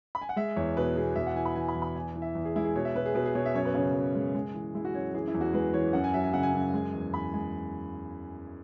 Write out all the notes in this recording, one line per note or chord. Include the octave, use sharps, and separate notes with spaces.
B5
G#5
F#5
G#3 E5
E2 C#5
B2 B4
B2 G#4
E2 E5
F#5
E3 G#5
B5
E3 G#5
B5
E2
B5
E2 G#5
E3
E5
E2
G#4
G#3 E4
G#4
B2 C#5
E5
B2 B4
G#4
B2 B4
G#4
B2 C#5
E5
F#2 C#5
B4
C#3 C#4
F#2
G#3
G#3
E3
G#3 E4
F#4
F#2 C#5
E3 G#4
E4
E2
F#4
G#3 B4
E3 C#5
F#2 F#5
G#5
F#3 E5
G#5
C#3 F#5
G#5
F#2
G#3
E2
E2 B5
G#3 G#5